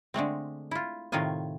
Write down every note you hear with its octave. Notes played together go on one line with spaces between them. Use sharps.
D3 G#3 A3 C4
E4 F4
A2 C3 D#3 A3 F4 G#5